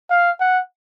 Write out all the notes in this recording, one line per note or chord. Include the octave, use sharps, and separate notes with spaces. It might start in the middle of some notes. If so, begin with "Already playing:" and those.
F5
F#5